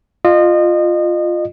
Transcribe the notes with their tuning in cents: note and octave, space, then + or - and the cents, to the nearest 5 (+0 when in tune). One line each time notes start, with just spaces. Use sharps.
F4 +0 D#5 -30